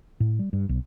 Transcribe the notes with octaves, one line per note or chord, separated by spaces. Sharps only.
A2
G3
G2
B1